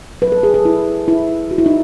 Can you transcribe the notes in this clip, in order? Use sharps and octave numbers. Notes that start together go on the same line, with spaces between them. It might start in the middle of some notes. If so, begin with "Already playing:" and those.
F#3 C#4 B4
A4
G#4
A4
E4
E4
F#4
E4
D#4